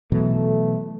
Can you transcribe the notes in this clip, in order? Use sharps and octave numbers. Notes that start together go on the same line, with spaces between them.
B2 E3 F#3 A3